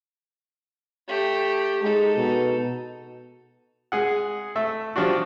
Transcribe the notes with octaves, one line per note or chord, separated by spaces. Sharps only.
A3 G4
G#3 D#4 A4
B2
G#3 G#4 F#5
A3 E5
F3 G3 D4 F#4